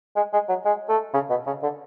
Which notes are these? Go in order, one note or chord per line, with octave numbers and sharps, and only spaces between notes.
G#3
G#3
F#3
G#3
A3
C#3
B2
C#3
D3